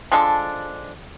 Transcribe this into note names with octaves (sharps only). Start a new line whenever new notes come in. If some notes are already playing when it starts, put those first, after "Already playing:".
F3 G#3 D4 A4